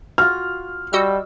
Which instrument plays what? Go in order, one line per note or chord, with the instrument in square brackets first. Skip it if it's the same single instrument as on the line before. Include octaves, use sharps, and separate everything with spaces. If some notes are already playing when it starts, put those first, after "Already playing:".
[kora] F4 F#4 [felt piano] F6
[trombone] G3 [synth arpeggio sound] F#4 D#5 E6